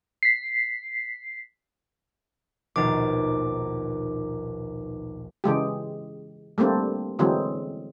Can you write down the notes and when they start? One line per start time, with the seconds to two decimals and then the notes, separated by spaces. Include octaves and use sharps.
0.23 B6 C7
2.76 A#1 D#2 B2 D#4 D6
5.44 C#3 E3 G#3 G4
6.58 G3 A3 A#3 C4 D4
7.19 D3 E3 F#3 G#3 C4